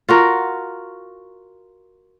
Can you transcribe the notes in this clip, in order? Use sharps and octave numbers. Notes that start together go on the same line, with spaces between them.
F4 F#4 A#4